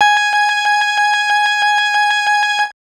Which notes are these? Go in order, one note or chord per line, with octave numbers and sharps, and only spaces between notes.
G#5 G#6